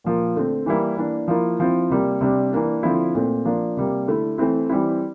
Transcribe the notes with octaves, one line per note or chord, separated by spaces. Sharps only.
A#2 F3 A#3
D3 A3 C4
E3 G3 A#3 E4
E3 A#3 D4
F3 A#3 E4
F3 C4 E4
C3 G3 A#3
C3 G3 D4
E3 A#3 D4
D3 F3 C4 E4
A#2 A3 C4
F3 A#3 D4
C3 G3 A#3
D3 A3 E4
E3 A3 C4 E4
E3 G3 C4 E4